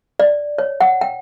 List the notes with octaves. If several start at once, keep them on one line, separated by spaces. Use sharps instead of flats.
D5
C#5
F#5
G5